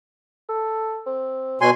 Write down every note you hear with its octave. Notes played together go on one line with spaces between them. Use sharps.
A4
C4
B2 F#3 G#5 C6